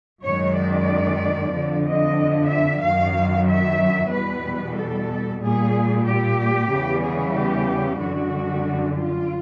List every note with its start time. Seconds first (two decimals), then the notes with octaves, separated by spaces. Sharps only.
0.23 F#2 D#3 G#3 C#5
0.56 D5
1.53 F2 D3 F3
1.85 D#5
2.50 E5
2.82 F#2 D#3 F#3 F5
3.47 E5
4.11 E2 B2 G3 B4
4.76 A4
5.41 A#2 G3 G#4
6.05 G4
6.70 E2 C#3 E3 G3
7.02 G#4
7.35 G4
8.00 F#2 D3 G3 F#4
8.96 F4